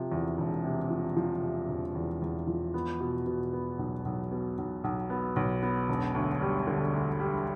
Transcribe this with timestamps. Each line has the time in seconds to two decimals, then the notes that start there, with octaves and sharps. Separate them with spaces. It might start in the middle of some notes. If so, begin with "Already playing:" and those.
Already playing: C3 F3
0.12 E2
0.38 E1
0.64 C3
0.90 F3
1.17 F3
1.42 C3
1.69 E1
1.95 E2
2.22 E2
2.47 F3
2.74 B3
3.00 B2
3.26 B2
3.53 B3
3.79 B1
4.05 B1
4.31 B2
4.58 B1
4.84 B1
5.10 B3
5.36 B1
5.63 B3
5.89 E1
6.15 D2
6.41 G3
6.67 D3
6.94 D2
7.20 G3